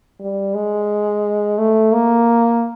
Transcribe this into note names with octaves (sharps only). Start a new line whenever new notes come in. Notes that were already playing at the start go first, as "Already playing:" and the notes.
G3
G#3
A3
A#3